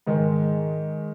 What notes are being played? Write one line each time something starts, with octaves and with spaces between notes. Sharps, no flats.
G#2 D#3 G#3